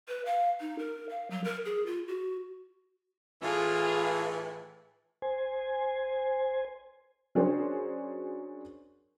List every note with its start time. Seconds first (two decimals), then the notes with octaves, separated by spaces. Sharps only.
0.08 B4
0.26 F5
0.61 D#4
0.79 A#4
1.09 F5
1.31 F#3
1.44 A#4
1.65 G#4
1.86 F4
2.08 F#4
3.42 A2 E3 F4 G#4
5.22 C5 G#5
7.35 F#3 C#4 D4 G#4 A#4 C5